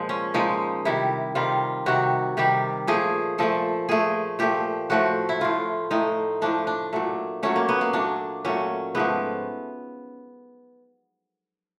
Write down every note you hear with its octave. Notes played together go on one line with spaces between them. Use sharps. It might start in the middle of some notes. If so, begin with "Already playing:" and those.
Already playing: A#2 F3 G#3
C#4
A#2 F3 G#3 D#4
C3 D#3 G3 E4
C3 D#3 G3 F4
C3 D#3 G3 F#4
C3 D#3 G3 G4
A#2 F3 A3 G#4
A#2 F3 A3 A4
A#2 F3 A3 G#4
A#2 F3 A3 G4
A2 F3 A3 F#4
E4
A2 F3 A3 F4
A2 F3 A3 D#4
A2 F3 A3 D4
D4
A#2 F#3 A3
A#2 F#3 A3 C#4
A#3
B3
A#3
A#2 F#3 A3 D4
A#2 F#3 A3 C#4
G#2 F3 A3 B3